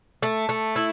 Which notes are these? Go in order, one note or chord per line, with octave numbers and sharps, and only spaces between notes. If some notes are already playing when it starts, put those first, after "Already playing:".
A3
A3
E4